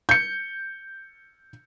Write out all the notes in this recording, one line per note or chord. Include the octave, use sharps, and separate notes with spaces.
G6 C#7